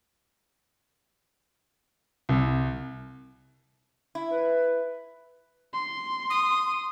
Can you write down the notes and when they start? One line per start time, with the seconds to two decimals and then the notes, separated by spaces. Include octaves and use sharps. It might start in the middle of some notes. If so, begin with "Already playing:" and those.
2.29 C2
4.15 E4
4.31 B4
5.74 C6
6.30 D#6